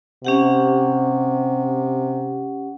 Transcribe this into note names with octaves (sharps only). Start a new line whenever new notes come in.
C3 C#4 G4 F#5